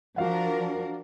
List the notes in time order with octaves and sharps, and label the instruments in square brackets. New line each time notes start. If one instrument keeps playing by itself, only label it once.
[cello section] F3 D4 A#4 [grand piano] F#4 F5 F#5